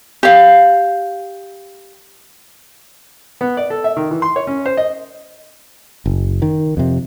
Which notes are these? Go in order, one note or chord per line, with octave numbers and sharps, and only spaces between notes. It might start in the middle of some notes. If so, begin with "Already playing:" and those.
G4 F5
B3
D5
A4
E5
D#3
E3
C6
C#5
C#4
C5
D#5
F#1
D#3
F2 C3